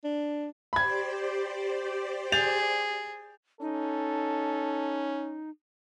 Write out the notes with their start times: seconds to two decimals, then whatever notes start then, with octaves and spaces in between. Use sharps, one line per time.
0.04 D4
0.73 G4 C5 D5 B5 G#6
2.32 G#4 G6 A6 F7
3.61 C#4 D#4 A4